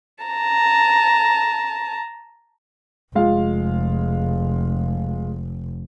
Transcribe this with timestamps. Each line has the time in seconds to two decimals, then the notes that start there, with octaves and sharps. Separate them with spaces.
0.25 A5 A#5
3.15 F1 G#3 F4 F5